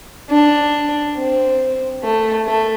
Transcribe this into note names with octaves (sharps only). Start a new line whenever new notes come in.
D4
C4
A3
A3